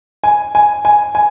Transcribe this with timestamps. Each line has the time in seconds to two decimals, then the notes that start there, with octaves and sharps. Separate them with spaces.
0.24 G#5
0.55 G#5
0.85 G#5
1.15 G#5